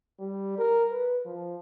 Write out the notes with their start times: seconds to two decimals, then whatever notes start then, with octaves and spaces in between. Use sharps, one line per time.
0.19 G3
0.58 A#4
0.91 B4
1.25 F3